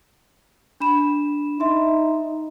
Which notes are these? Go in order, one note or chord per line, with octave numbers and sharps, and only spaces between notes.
D4 B5 E7
D#4 E5 C6